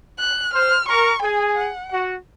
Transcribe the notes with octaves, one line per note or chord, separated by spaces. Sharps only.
F#6
C5 F6
A#4 C#6
G#4 G#5
F#5
F#4